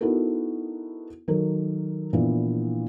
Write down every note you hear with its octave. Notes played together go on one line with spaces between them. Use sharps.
B3 D#4 E4 F#4 A4 A#4
D#3 F#3 A4 A#4
A#2 E3 F3 B3 D4 E4